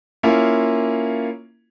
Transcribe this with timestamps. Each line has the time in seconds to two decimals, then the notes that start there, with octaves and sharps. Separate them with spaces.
0.23 A#3 C#4 E4 F4